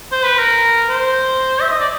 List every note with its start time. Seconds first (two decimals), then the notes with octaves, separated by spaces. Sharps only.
0.12 C5
0.25 B4
0.39 A#4
0.89 C5
1.62 E5
1.70 D#5
1.80 D5